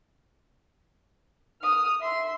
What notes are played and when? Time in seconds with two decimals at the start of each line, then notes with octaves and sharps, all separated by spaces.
1.62 D#6 F6
2.01 E5 C6